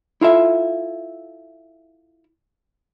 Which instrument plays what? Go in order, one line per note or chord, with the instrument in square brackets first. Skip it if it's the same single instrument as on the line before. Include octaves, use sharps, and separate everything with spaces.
[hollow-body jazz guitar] E4 F4 A4 E5